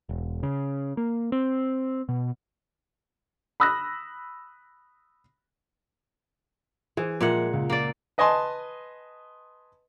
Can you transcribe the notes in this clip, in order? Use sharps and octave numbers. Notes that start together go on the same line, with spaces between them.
E1
C#3
A#3
C4
B2
B5 D#6 E6 F#6 A#6
E3 G#4 C5
A#2 F3 G#3 A#3 E5 F#5
C#2
A#3 D5
B4 D#5 G#5 A5 C6